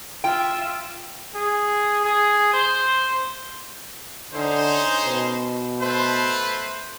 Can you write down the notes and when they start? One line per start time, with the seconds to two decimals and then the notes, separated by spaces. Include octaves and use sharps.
0.24 F4 E5 G5
1.35 G#4
2.05 G#4
2.53 C5
4.34 D3 C#4 D#4 C5
5.05 B2
5.81 A3 B4 C5